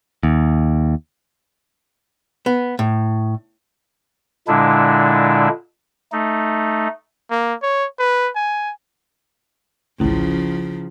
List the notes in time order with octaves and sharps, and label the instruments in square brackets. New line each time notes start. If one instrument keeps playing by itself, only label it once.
[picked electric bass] D#2
[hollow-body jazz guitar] B3
A2
[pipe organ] A#2 D3 G#3 D4 E4
A3 D#4
[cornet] A#3
C#5
B4
G#5
[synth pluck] A1 D2 [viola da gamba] C#3 F3 [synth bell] C#4 E4